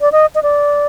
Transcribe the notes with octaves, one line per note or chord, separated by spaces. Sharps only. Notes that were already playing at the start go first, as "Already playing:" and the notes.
D5
D#5
D#5
D5